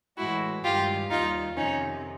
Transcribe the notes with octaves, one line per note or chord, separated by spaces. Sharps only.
A2 E3 G#3 E4 F#4
G2 D#3 G#3 F4 G4
D#2 D#3 G3 D#4 F4
F2 C3 D#3 C#4 D#4